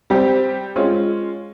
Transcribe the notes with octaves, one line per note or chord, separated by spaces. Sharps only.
G3 C4 G4
G#3 C#4 F4